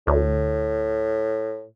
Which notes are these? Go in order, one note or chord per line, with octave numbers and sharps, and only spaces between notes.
D2 A2